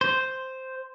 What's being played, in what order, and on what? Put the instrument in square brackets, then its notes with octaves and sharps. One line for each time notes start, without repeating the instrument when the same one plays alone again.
[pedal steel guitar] C5